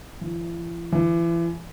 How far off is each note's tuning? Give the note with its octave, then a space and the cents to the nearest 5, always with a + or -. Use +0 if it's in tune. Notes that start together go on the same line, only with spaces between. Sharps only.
E3 +45
E3 +35